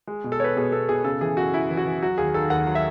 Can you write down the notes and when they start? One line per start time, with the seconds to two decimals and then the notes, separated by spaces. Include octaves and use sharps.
0.07 G#3
0.24 B2
0.32 A4
0.40 B3 B4 C#5
0.56 B2 G#4
0.72 B3 A4
0.89 B2 G#4
1.04 C#3 A4
1.21 E3 G#4
1.37 F#2 F#4
1.53 F#2 E4
1.70 E3
1.77 F#4
1.85 E3
2.02 F#3 F#4
2.18 D#2 G#4
2.34 D#3 A4
2.50 D#2 F#5
2.67 F#3
2.75 E5